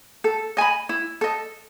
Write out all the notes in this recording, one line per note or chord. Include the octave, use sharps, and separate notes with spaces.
A4
D#5 G#5 B5
E4
A4 D#5